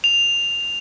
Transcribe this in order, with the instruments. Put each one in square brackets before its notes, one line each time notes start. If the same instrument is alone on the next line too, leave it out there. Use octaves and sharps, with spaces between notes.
[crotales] F7